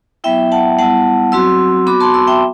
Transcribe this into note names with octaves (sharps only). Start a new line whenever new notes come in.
F#3 B3 E4 E5 G5
F#5 A5
G3 B3 E4 F#5 A5
F#3 C4 F#4 C6 E6
B3 F#4 B5 D6
A5 C6
C6 E6
E5 G5